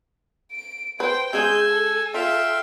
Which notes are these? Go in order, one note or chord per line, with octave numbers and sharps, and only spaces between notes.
D7
B4 C5 G5
C#3 G#3 G#4 G#5 E6 G6
A4
F4 E5 F5 G5